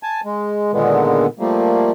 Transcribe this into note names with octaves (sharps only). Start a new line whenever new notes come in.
G#5 A5
G#3
A#2 D3 D#3 G#3 B3
F3 G3 A3 A#3